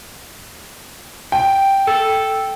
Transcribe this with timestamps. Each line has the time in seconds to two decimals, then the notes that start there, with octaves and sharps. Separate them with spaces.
1.32 G5
1.87 A4